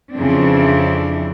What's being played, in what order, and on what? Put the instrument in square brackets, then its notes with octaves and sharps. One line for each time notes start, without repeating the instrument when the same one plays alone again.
[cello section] F2 C#3 E3 C4 D4